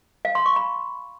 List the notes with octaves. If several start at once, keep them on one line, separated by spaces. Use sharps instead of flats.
F5
C6
C#6
B5